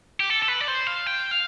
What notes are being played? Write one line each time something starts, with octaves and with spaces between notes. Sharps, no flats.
G4
A4
A4
B4
D5
C5
F5
G5
F5